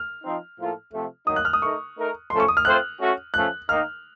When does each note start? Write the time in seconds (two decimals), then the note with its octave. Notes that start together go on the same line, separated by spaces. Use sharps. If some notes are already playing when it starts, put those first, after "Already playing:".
Already playing: F6
0.24 F3 C4 D#4
0.58 A2 F3 A#3 F4 A4
0.92 C3 F3 A3
1.27 D#3 F#3 A#3 D#4 D#6
1.36 F#6
1.45 F6
1.53 D#6
1.61 A3 D#4 A#4 C#6
1.97 A3 D#4 A#4
2.30 F3 A3 C#4 A4 C6
2.40 C#6
2.48 D#6
2.57 F6
2.65 A3 C4 F4 C5 F#6
2.99 A3 C#4 F#4
3.34 F3 A3 C#4 F#6
3.69 D#3 A#3 D#4 F6